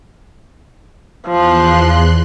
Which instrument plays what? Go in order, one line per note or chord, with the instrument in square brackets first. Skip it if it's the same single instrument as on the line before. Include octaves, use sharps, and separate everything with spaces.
[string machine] E2 C6 F#6 [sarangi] F3